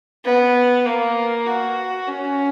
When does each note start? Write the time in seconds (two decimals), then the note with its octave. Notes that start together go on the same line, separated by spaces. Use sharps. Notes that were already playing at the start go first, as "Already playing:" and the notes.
0.24 B3
0.86 A#3
1.46 F#4
2.07 C#4